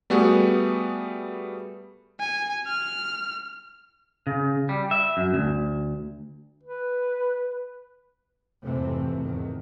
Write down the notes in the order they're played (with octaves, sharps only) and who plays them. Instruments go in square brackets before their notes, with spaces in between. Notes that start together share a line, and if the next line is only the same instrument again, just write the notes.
[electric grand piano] G3 A3 B3 F#4 G#4
[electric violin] G#5
F6
[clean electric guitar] C#3
G3
E5
F#2
D2
[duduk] B4
[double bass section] F2 G#2 C3 E3 A3 C4
E2 D#3